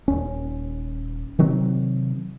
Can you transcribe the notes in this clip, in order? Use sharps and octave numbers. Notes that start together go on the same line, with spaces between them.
D#1 D#2 C#4
C3 D#3 F#3 C4